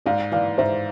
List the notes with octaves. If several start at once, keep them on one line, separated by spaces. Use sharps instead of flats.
G#2 D5 F5
E3 D5 F5
G#2 C5 E5